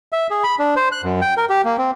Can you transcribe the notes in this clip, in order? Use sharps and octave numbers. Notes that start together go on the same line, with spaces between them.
E5
G#4
B5
D4
C5
F#6
F#2
G5
A#4
G4
A#3
C4